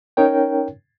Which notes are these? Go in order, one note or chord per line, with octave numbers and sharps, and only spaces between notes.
C#4 D#4 A#4 C#5 G5